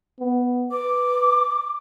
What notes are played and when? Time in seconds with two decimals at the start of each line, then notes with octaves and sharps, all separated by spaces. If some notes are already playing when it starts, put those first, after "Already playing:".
0.20 B3
0.72 B4 D6